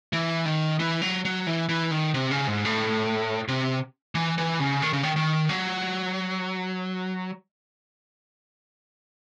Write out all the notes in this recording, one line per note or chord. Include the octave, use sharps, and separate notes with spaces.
E3
D#3
E3
F#3
F#3
E3
E3
D#3
C3
C#3
G#2
A2
C3
E3
E3
C#3
D#3
C#3
D#3
D#3
F#3